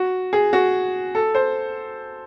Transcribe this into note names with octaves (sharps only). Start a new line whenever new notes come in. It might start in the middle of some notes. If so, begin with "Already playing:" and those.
Already playing: F#4
G#4
F#4
A4
C5